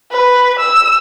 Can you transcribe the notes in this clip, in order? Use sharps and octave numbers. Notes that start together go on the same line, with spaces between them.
B4
E6